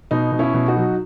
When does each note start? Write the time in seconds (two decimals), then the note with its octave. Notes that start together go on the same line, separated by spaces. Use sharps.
0.11 B2 D#4
0.32 B2
0.39 C#4 E4
0.54 B2
0.68 D#4 F#4
0.77 F#3